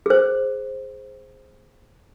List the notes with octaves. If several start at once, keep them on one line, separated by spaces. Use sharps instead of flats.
G#4 C5